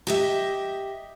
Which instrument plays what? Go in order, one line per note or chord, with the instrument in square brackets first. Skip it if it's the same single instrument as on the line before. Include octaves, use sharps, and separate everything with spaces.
[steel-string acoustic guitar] G4 D#5 E5